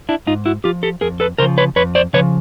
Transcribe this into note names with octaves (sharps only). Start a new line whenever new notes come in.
D4 E4
G#2 D#4 F4
E4 F#4
F3 F4 G4
G4 A4
F2 G#4 A#4
A4 B4
C#3 F3 A#4 C5
B4 C#5
F2 B4 C#5
C5 D5
C#3 F3 B4 C#5